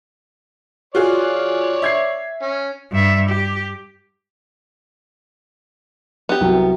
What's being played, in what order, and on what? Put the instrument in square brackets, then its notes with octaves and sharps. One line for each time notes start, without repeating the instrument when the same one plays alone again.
[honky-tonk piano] F4 F#4 G#4 [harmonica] C#5 D5
[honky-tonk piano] E5 G#6 C7
[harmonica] C#4
[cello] G2 E5
G4
[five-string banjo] B3 G4
[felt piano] C2 F#3